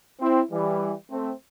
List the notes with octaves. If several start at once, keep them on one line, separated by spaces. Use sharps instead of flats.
C4 E4
E3 G3
A3 C4